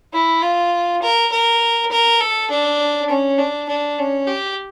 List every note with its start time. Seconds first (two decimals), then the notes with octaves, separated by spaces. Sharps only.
0.13 E4
0.42 F4
1.02 A#4
1.32 A#4
1.91 A#4
2.21 A4
2.50 D4
3.09 C#4
3.39 D4
3.69 D4
3.98 C#4
4.27 G4